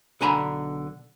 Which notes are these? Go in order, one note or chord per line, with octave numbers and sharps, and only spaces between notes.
B1 D3 D4 G#5 A#5 B5